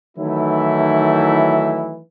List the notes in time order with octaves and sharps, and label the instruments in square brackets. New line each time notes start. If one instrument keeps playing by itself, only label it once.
[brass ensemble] D#3 E3 F#3 A3 D#4 E4